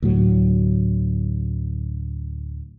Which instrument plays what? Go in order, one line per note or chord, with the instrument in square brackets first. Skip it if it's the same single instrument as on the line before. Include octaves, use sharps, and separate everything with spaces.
[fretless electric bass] D2 A2 F#3